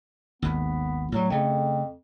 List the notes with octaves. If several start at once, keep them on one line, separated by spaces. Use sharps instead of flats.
G#1 D#2 B3
A2 F#3 G3
F2 C#3 A3